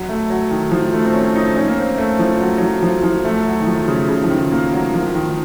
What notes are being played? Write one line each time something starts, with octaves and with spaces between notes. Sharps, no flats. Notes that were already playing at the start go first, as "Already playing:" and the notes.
Already playing: F#3
A3
F#3
D#3
F3
A3
C4
C#4
D#4
C#4
A#3
C4
A3
F3
F#3
F#3
F3
F3
F3
A3
F#3
D#3
F3
C#3
C#3
F3
D#3
A#3
F#3
F3
D#3